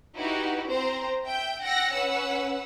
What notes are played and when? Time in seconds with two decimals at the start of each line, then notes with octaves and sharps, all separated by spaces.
0.17 D#4 E4 F#4 G4 B4
0.68 C4 C5 A#5
1.26 E5 G5 G6
1.62 F#5 G5 E6 A#6 C#7
1.93 C#4 B4 F#5 E6